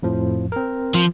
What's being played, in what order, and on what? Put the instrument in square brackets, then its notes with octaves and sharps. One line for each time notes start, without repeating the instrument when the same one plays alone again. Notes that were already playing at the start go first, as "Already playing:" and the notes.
[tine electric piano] F2 A2 F3
C4 A#4
[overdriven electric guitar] F3